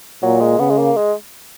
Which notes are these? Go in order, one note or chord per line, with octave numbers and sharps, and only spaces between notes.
A#2 F#3
G#3
C#3 B3
G#3
A#3
G#3